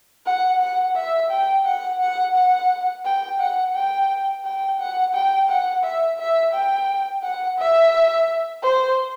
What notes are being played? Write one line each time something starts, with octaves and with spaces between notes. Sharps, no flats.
F#5
F#5
E5
G5
F#5
F#5
F#5
G5
F#5
G5
G5
F#5
G5
F#5
E5
E5
G5
F#5
E5
C5